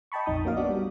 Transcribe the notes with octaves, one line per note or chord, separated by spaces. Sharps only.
D#5 G5 A5 B5 C#6
A#1 F2 D#4 D#6
A#3 C#4 F#4 D#5 F5
B3 D4 F#4 D5
G3